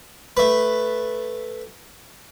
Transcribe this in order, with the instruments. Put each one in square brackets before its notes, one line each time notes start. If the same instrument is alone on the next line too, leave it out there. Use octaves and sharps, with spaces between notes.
[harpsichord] A3 B4